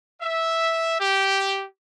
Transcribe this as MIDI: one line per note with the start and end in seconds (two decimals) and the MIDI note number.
0.21 0.99 76
1.00 1.65 67